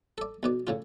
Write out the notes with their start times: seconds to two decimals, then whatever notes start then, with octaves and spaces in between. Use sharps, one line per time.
0.18 A4 D5
0.43 B1 B2 D5
0.67 A2 C#3 F4